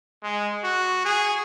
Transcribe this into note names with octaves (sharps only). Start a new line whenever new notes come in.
G#3
F#4
G#4